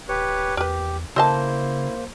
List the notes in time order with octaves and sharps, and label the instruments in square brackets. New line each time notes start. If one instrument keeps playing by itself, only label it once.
[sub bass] D#1 [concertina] G4 B4 C#5
[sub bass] E2 [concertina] G4 [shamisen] A#4 B4
[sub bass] C#3 [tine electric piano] A#3 C5 [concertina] E4 [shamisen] A4 D#5 A5